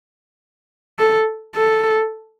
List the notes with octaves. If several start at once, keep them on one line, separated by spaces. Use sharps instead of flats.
A4
A4